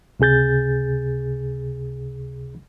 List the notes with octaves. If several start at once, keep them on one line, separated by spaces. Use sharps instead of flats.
C#2 C3 G#4 G6 A6